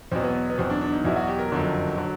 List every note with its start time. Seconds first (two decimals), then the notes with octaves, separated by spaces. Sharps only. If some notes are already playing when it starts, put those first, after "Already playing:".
0.11 E2 B2 F#3 C4
0.23 B3
0.50 B3
0.58 E2 B2 F#3 C4
0.70 D4
0.81 D4
0.93 D#4
1.05 E2 B2 F#3 E4
1.16 F#4
1.28 G4
1.39 A#4
1.52 F#1 F2 D3 F#3
1.97 D3 F#3